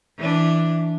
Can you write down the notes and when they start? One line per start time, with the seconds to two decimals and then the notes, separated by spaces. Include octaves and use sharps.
0.18 E3 D4